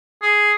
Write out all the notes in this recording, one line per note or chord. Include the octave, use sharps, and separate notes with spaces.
G#4